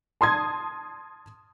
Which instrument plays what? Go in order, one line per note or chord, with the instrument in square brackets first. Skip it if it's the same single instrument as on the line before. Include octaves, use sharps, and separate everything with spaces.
[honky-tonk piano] A5 C6 D#6 G#6